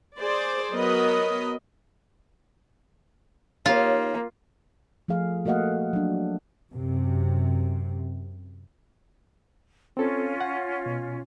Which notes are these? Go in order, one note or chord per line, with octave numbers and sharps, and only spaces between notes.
G#4 C5 D5
F#3 B3 A#4 D#5 B5
A#3 D#4 F4 G4 C#5
F3 A3 G#4 F5
A3 A#3 F#4 D#5 F5 F#5
F#3 D4
F#2 C3
C4 C#4 F4 A4
F#5
B2